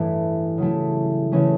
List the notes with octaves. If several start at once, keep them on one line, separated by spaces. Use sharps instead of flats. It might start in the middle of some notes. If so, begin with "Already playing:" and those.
Already playing: A1 G2 E3 A3 E4
C#3 F#3 A3 C#4 E4
C#3 E3 A3 C#4